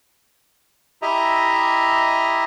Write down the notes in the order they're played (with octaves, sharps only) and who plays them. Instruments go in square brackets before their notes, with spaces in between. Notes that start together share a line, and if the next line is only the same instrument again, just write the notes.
[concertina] E4 G4 D#5 E5 A#5